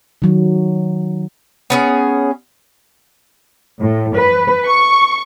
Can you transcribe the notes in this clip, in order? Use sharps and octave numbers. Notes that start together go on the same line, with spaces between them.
D#3 F#3
B3 C#4 G#4
A2
B4
C#6